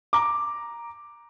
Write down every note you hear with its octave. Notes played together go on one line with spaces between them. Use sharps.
A#5 D6